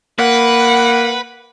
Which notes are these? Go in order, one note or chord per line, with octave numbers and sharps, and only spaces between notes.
A#3 B4 F#5